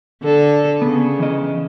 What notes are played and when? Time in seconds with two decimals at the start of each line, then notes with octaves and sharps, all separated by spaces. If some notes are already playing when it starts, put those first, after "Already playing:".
0.22 D3 A4
0.82 C#3 B3
1.19 E3 D#5